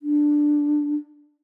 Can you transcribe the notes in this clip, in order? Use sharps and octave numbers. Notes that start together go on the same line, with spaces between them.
D4